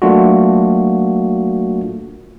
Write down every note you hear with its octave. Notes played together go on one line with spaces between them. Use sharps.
F#3 A3 A#3 D4 F4 F#4